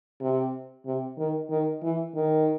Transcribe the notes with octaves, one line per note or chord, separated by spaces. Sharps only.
C3
C3
D#3
D#3
E3
D#3